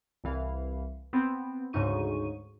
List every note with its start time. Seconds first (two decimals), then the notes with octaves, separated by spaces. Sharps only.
0.24 C2 E3 F5
1.13 B3 C4
1.73 D2 G#2 C#3 D#4 C#6 D#7